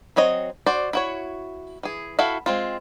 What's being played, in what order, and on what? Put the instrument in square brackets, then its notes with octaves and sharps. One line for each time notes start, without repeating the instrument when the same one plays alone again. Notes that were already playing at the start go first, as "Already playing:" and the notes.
[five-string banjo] F#3 C4 C#5 D#5
F#4 C5 D5
E4 F#4 C#5
E3 G#4
E4 F#4 A4 E5 F5
G#3 C4 F4